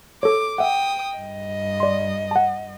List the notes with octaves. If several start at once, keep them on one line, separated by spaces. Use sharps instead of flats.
A4 C#5 D6
E5 F#5 G5 D#6
G2 D#5
D5 C6
F#5 A5